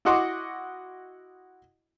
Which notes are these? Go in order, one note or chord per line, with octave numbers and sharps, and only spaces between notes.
E4 F#4 D#5 F#5 C6 D6